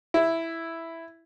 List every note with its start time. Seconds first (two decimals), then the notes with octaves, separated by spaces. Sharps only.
0.14 E4